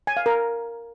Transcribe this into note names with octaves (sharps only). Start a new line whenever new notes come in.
G#5
F5
A#4